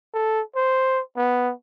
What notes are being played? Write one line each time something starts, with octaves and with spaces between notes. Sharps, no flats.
A4
C5
B3